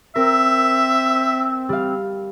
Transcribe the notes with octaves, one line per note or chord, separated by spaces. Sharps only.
C4 A#4 E5
G3 F5